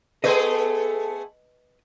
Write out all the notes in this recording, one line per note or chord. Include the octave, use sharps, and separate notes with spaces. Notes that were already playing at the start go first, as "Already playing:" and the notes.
A3 B3 G#4 A4 B4 D#5